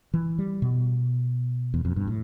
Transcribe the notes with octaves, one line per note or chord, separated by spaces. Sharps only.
E3
G3
B2
E2
F2
G2
A2